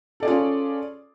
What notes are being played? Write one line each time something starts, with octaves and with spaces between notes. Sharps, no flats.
C#4 F4 G#4 A4 D5